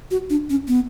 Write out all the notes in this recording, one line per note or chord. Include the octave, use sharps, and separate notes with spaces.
F#4
D4
C#4
B3